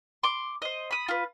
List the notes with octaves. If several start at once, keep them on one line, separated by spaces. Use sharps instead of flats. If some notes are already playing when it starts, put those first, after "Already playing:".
C6 D6
C5 D#5
B5 D#6
F4 B4